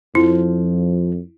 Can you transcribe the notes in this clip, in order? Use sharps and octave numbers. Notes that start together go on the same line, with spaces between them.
F2 F3 E4